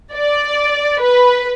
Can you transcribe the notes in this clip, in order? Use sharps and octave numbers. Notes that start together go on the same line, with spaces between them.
D5
B4